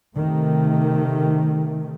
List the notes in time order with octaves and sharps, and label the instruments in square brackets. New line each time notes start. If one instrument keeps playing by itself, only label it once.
[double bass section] C3 D#3 A3